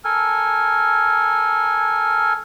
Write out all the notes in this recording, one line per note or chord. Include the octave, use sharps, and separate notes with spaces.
A4 A#4 G#5